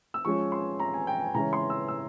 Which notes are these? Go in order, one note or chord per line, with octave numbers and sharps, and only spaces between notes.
E6
F3 G#3 C#4 C#6
C6
A#5
G#5
G5
G#5
C#3 E3 G#3 C#4 A#5
C6
E6
E6